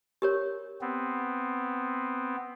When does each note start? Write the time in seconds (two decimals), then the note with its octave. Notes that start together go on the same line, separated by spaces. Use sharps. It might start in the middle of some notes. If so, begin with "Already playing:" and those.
0.22 G4 A#4 C#5
0.81 B3 C4